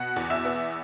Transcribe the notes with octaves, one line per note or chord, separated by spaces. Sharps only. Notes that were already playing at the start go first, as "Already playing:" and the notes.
Already playing: B2 F#5 F#6
E2
E5 E6
B3